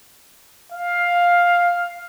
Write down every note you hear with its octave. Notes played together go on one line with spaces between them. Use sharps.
F5